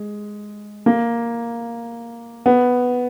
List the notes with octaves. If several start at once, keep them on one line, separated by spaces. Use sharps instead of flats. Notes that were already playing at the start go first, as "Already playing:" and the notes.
Already playing: G#3
A#3
B3